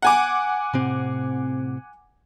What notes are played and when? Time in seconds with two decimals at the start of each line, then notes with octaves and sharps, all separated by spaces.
0.02 F#5 G#5 D6
0.73 A2 C3 C4